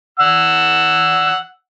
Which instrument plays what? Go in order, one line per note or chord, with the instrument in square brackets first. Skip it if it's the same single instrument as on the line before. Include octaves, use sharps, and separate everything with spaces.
[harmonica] F#5 E6